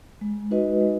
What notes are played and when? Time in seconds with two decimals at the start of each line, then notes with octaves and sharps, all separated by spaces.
0.21 G#3
0.51 D#4 F#4 B4 D#5
0.81 G#3